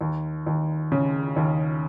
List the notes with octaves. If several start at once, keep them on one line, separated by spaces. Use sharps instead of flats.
D#2
D#2
C#3
D#2